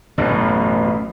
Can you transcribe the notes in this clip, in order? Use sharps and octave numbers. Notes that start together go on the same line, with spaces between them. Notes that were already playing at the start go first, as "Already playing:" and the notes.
A1 F#2 B2